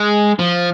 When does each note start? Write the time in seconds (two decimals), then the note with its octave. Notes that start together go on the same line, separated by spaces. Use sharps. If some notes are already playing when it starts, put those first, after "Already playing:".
Already playing: G#3
0.39 F3